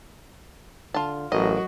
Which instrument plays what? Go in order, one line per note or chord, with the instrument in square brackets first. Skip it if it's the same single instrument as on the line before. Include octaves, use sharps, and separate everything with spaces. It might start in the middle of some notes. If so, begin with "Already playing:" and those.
[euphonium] D3 [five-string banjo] F4 A5
[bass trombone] A1 [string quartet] F#3 F#4 [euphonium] A#4 [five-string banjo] D#5